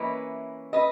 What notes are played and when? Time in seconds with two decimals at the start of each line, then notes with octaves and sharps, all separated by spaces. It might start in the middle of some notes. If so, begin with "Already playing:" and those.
Already playing: E3 A#3 C#4 E4 B4 D#5
0.73 B4 D#5